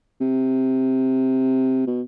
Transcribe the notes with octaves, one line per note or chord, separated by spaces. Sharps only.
C3
B2